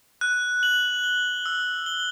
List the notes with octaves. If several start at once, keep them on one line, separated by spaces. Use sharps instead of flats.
F#6
F#7
G7
E6
G7